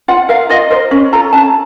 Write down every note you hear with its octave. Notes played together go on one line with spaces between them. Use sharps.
F4 F#5
A#4 F5
F4 D#5
A#4 C5
C#4
F4 A4 A#5
C#4 A5